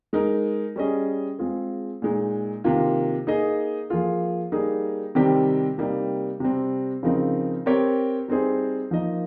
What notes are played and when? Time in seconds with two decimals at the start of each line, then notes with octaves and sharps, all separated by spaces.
0.13 G#3 D#4 A#4
0.76 G3 C#4 G#4 D#5
1.39 G#3 C4 F4 G#4
2.02 A#2 G#3 D#4
2.64 C3 D#3 A#3 F4
3.27 A#3 D#4 G#4 D#5
3.90 F3 A#3 F4 G#4
4.52 G3 A#3 D#4 G#4
5.15 C3 D#3 G3 C4 G4
5.78 C3 G3 A#3 D#4
6.40 C3 G3 C4
7.03 C#3 F3 C4 D#4 A#4
7.66 C4 G4 A#4 C#5
8.28 G3 C4 D#4 G#4 C5
8.91 F3 A#3 D#4 A#4 D#5